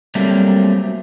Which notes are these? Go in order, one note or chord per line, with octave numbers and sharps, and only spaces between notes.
F#3 G3 A3 A#3 C4